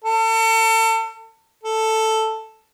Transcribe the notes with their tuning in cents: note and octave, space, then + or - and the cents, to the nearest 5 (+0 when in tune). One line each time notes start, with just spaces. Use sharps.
A4 +35
A4 +5